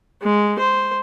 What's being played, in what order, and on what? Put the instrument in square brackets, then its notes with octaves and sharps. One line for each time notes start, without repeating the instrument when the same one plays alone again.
[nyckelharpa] G#3
C5